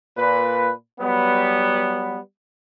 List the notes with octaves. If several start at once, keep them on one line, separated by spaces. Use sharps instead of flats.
A#2 B4
F#3 G3 B3